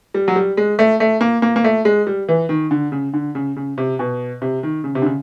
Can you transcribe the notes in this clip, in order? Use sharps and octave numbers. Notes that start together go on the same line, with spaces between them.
G3
F#3
G3
G#3
A3
A3
A#3
A#3
A#3
A3
G#3
G3
E3
D#3
D3
C#3
D3
C#3
C#3
C3
B2
C3
D#3
C#3
C3
D3
C#3